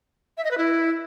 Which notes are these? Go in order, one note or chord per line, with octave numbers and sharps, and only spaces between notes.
E5
D#5
B4
E4